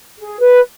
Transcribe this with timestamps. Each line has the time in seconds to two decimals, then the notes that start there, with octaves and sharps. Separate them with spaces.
0.18 G#4
0.40 B4